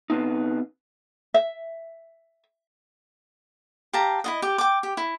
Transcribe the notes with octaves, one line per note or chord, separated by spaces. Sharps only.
C#3 B3 C4 D#4
E5
G4 F5 A5 A#5
E4 F4 D#5
G4
G5 D6
G4
E4